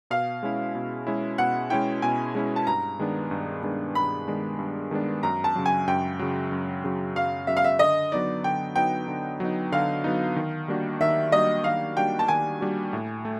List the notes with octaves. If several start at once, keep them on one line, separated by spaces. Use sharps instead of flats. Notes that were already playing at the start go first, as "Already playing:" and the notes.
B2 F5
G#3 C#4 E4
B2
G#3 C#4 E4
B2 F#5
G#3 C#4 E4 G5
B2 G#5
G#3 C#4 E4
A5
G2 A#5
D#3 G#3 B3 D4
G2
D#3 G#3 B3 D4
G2 B5
D#3 G#3 B3 D4
G2
D#3 G#3 B3 D4
F#2 A#5
A5
C#3 F#3
G#5
F#2 G5
C#3 F#3
F#2
C#3 F#3
F#2 F5
C#3 F#3 E5
F5
E5
D3 D#5
F#3 B3 D#4 D5
D3 G5
F#3 B3 D#4 G5
D3
F#3 B3 D#4
D3 F5
F#3 B3 D#4
D#3
G3 A#3 D4 F#4
D#3 E5
G3 A#3 D4 F#4 D#5
D#3 F5
G3 A#3 D4 F#4 G5
A5
D#3 G#5
G3 A#3 D4 F#4
A2
A3